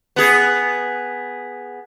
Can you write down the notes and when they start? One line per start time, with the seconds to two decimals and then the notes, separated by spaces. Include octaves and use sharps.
0.16 B3 G#4